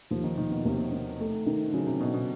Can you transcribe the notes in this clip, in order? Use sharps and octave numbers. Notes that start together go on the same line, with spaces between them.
D#2 F3
D#3
D#2 D#3
B2
D#2 C3
D#3
A3
D#3
D3
C#3 F#3
C3
B2 D4
B2